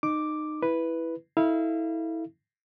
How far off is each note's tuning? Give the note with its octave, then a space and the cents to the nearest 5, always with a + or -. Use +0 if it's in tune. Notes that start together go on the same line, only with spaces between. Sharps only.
D#4 -20 D6 +0
E4 +0 B4 +0
E4 -25 A4 +0 F5 -30